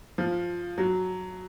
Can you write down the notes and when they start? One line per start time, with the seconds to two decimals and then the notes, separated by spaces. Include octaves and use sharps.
0.18 F3
0.78 F#3